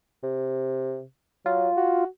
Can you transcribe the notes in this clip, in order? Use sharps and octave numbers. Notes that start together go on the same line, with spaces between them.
C3
F#3 F4
F#4